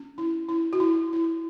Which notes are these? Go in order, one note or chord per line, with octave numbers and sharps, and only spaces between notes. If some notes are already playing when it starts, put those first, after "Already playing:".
Already playing: C#4
E4
E4
F#4
E4
E4